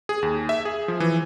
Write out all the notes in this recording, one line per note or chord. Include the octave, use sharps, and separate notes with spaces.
G#4
D#2
E5
G#4
F3
E3